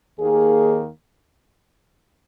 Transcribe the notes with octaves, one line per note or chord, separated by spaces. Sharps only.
D#2 D#3 A#3 G#4